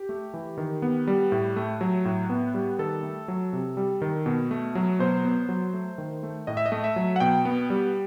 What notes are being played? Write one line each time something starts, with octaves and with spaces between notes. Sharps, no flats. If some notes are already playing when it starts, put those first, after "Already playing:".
Already playing: G4
A3
E3
D#3
B3
G3
A2
A3
F#3
A2
B3
G3
D#3 A4
A3
F#3
C3
G3
D#3
B2
A3
F#3
B2 C5
B3
F#3
A3
D#3
A3
A2 D#5
E5
D#5
A3
E5
F#3
F#5
B2 G5
B3
G3